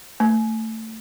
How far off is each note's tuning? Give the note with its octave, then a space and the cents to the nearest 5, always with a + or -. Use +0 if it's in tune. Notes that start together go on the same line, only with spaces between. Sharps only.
A3 +20